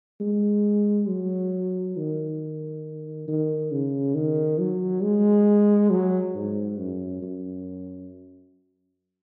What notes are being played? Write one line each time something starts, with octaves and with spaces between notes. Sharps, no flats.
G#3
F#3
D#3
D#3
C#3
D#3
F#3
G#3
F#3
G#2
F#2
F#2